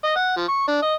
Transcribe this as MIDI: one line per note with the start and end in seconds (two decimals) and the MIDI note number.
0.04 0.14 75
0.16 0.36 78
0.37 0.44 53
0.48 0.64 85
0.67 0.78 62
0.82 0.94 75